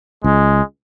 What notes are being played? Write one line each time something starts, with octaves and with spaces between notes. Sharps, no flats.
C#2 G#3